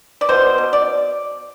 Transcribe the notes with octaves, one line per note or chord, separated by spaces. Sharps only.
D5
B2 C5
B2
D5